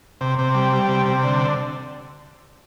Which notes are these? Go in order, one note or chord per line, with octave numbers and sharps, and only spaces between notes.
C3
C3
G3
G3
C3
C3
D3